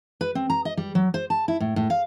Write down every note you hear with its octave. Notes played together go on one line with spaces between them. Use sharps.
B4
C4
A#5
D#5
G3
F#3
C5
A5
E4
A2
A2
F5